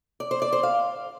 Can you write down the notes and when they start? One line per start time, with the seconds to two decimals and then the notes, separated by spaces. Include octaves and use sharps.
0.20 D5
0.31 C5
0.42 D5
0.53 C5
0.63 F5